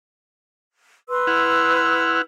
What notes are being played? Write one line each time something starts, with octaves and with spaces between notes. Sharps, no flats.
B4 C6 E6
E4 F#5 F6